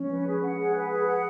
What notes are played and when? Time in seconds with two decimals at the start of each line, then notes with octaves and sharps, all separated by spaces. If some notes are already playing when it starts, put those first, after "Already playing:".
Already playing: F3 G#3 C#4
0.10 B4
0.27 G#4
0.43 F#5
0.58 G#4
0.75 B4
0.90 G#4
1.06 F#5